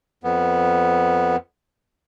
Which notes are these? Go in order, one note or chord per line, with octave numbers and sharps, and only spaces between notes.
F2 B3